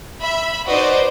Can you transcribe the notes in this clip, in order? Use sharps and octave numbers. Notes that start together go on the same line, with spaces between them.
E5 B5
D#4 F#4 B4 C5 D5 D#5